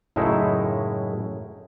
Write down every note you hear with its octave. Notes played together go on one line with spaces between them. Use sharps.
F#2 A2 C#3 G#3 D#4 E4